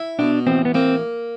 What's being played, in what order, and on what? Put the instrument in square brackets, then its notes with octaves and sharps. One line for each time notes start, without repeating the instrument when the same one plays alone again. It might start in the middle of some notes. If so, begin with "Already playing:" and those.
Already playing: [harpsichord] E4
[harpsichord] B2 [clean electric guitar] D4
[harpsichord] A1 [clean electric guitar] C4
[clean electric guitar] B3
[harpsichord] A#3 [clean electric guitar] C4